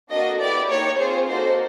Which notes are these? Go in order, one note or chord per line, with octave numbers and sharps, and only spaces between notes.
A#3 D4 F#4 A4 D#5
B3 E4 G4 D5
A#3 D#4 G4 C#5
C4 F4 G#4 C5
A#3 D#4 F#4 A4 C5